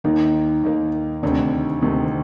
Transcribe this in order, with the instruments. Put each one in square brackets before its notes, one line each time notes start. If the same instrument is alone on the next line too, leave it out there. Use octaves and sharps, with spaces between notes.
[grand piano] D#2 D#3 A#3 [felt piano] D#4
[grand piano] D#2 D#3 A#3
[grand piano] D2 C3 D#3 [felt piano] D4
[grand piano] D2 C3 D#3 [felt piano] C4